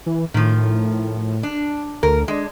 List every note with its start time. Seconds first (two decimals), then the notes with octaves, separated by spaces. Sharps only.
0.06 E3
0.34 A2 D#3 F3
1.43 D4
2.03 D2 A#4
2.28 G#3 D4